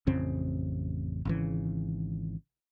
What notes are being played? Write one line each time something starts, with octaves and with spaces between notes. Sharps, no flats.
A1 F2 C#3 C4
G#1 C#3 E3